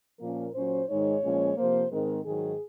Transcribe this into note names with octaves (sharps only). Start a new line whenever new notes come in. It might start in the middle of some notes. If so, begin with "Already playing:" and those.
A#2 F3 A#3 C#4 A#4
A#2 F#3 C#4 C5
G#2 D#3 G#3 D#4 C#5
A#2 F3 G#3 C#4
C3 F3 A#3 C5
G#2 D#3 G#3 C4 A#4
G#2 D#3 F#3 G#4